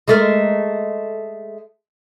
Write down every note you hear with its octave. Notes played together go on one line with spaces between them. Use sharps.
G#3 A3 A#4